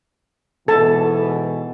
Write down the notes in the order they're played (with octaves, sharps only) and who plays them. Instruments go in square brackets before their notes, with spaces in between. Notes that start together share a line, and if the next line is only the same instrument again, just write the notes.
[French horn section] G#2 B2 E3 [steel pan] A4 A5